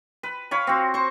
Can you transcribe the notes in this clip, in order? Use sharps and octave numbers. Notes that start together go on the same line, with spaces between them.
B4
C#5 F5 B5
C4 F#4
C5 C#6